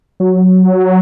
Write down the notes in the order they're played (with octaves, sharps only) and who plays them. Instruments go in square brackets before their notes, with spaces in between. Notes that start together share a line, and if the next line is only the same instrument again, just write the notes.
[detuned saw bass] F#3